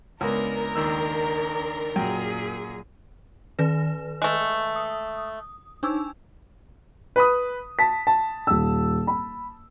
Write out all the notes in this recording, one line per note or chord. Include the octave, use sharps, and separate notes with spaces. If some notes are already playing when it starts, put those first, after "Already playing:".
C#2 B3 D4 A#4
D#2 D#3 D4 E6
F#2 A#2 G#4 G5
D#3 B4
G#3 A3
D#6
D4 D#4 E6
B4 B5 D#6
A5 B6
A5
D#1 E6
B5